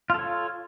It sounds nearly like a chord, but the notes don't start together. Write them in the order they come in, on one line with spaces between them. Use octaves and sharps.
F4 A4 C#5